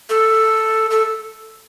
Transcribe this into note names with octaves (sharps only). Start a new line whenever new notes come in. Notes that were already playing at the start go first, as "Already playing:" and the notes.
A4
A4